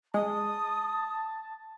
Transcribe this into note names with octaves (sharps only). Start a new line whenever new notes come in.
G#3 A5 D#6